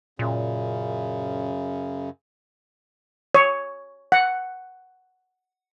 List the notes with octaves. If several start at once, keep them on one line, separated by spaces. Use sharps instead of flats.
F#2 A#2 C#3
C#5
F#5